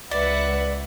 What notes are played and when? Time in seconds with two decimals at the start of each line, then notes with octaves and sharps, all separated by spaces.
0.11 C#2 B4 D5 E5 F#5